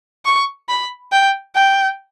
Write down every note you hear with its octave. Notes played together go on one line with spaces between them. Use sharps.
C#6
B5
G5
G5